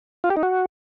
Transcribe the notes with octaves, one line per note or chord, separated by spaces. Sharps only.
F4
G4
D#4
F#4